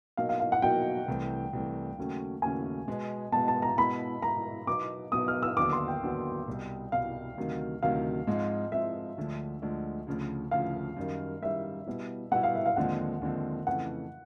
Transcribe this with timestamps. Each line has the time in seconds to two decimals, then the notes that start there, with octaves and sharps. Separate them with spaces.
0.17 B2 F#3 A#3 D#4 F5
0.29 F5
0.40 F5
0.52 F#5
0.62 B2 F#3 A#3 D#4 G5
1.08 C2 C3 E3 A3
1.53 C2 C3 E3 A3
1.97 D#2 C#3 F#3 A3 C#4
2.42 D#2 C#3 F#3 A3 C#4 G#5
2.88 B2 G#3 B3
3.32 B2 G#3 B3 A5
3.48 A5
3.62 A#5
3.78 B2 G#3 B3 E4 B5
4.22 B2 G#3 B3 E4 A#5
4.67 B2 F#3 B3 D#4 D6
5.12 B2 F#3 B3 D#4 D#6
5.28 F6
5.43 E6
5.57 D#2 D3 F#3 B3 D6
5.73 C6
5.88 G5
6.03 D#2 D3 F#3 B3
6.48 C2 B2 G3
6.92 C2 B2 G3 F5
7.37 D2 C3 D#3 F#3
7.82 D2 C3 D#3 F#3 F5
8.27 G#2 F3 G#3 C4
8.72 G#2 F3 G#3 C4 E5
9.17 D2 D3 F3 G#3
9.62 D2 D3 F3 G#3
10.07 D2 C#3 F3
10.51 D2 C#3 F3 F5
10.97 F#2 D#3 G3
11.42 F#2 D#3 G3 E5
11.86 B2 G3 B3 E4
12.31 B2 G3 B3 E4 F#5
12.43 F5
12.55 E5
12.66 F5
12.76 D#2 D3 F3 G#3 C4 F#5
13.21 D#2 D3 F3 G#3 C4
13.67 F2 C#3 E3 A3 F#5